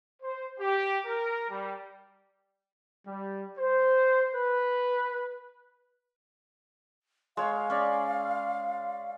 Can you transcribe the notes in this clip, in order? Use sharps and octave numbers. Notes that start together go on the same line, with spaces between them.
C5
G4
A#4
G3
G3
C5
B4
G#3 C#5 F5
C#4 D5